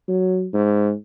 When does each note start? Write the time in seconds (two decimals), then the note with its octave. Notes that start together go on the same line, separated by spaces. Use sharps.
0.08 F#3
0.53 G#2